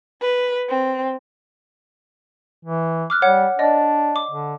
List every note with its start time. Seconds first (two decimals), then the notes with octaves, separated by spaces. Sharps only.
0.21 B4
0.68 C4
2.65 E3
3.10 D6 F6 F#6
3.22 G3 C#5 F#5
3.59 D4 D5 D#5
4.16 D6
4.31 D3